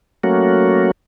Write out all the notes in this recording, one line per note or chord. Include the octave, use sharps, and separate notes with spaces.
F#3 A3 A#3 C#4 F#4